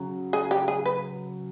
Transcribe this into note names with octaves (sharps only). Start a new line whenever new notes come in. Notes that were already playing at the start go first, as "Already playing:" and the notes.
Already playing: C#3 F#3
G#4
G4
G#4
B4